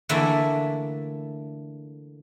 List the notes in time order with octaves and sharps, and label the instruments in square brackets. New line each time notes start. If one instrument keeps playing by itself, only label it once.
[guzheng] D3 E3 A3 A#3 D4 E4